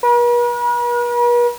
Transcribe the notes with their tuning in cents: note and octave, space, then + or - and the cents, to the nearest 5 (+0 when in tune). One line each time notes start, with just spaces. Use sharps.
B4 -45